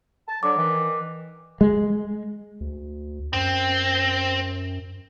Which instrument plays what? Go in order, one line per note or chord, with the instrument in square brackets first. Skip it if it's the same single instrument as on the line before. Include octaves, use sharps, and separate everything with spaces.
[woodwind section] A5
[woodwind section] D3 F#3 [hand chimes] D6
[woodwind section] D#3 E3
[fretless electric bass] G#3
[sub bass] D2
[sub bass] F#2 [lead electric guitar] C4